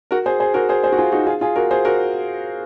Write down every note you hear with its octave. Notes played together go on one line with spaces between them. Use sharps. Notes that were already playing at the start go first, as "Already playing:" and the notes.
F#4 A#4
G#4 C5
G#4 C5
F#4 A#4
G#4 C5
G#4 C5
F#4
F4 G#4
D#4 F#4
F4 G#4
F4 G#4
F#4 A#4
G#4 C5
F#4 A#4